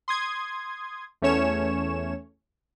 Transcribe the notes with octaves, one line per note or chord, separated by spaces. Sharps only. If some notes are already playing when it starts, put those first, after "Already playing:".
C6 D#6 G#6
E2 A3 C#4 C#5 E7